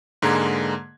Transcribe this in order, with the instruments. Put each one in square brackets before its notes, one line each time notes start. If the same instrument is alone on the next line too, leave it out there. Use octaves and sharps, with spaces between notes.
[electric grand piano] G#2 D3 G#3 A#3 A#5 G#6